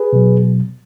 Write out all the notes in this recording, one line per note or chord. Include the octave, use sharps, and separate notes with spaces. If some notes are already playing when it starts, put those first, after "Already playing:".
Already playing: G#4 B4
B2 F#3